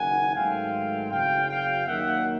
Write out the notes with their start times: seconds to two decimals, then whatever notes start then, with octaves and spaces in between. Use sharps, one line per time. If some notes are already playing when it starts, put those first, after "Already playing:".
Already playing: F#1 F#2 D#3 F#5 G#5
0.34 G#2 D#3 F#3 A3 C4 F5 G5
1.10 F#1 F#2 C#3 F#3 F5 G5
1.48 F5 G5
1.86 D#2 D#3 F#3 A#3 E5 F#5